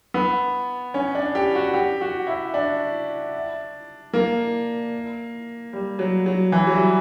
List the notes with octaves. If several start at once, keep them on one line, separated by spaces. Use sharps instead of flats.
B3
C#4
D4
G4
F#4
G4
F#4
E4
D4
A#3
G3
F#3
F#3
E3
F#3
G3